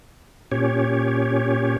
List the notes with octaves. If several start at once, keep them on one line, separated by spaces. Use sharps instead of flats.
A#2 C#4 G4 C#5